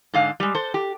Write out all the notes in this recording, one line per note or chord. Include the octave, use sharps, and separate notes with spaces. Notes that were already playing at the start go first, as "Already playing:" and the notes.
G#2 D3 F5
G3 G#3
A4 C5
G4